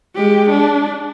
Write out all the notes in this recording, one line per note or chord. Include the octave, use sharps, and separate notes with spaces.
G#3 G4
D4